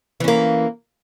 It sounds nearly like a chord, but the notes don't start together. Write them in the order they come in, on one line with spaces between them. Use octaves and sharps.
E3 C#4 A#3